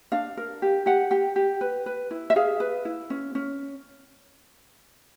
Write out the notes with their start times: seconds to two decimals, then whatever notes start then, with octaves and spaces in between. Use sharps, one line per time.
0.12 D4 F5
0.37 A#4
0.62 G4
0.86 G4 F#5
1.11 G4 G5
1.36 G4
1.61 B4
1.86 B4
2.11 E4
2.30 E5
2.36 G#4 F5
2.60 B4
2.85 E4
3.10 C#4
3.35 C#4